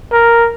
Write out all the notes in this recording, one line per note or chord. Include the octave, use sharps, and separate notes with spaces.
A#4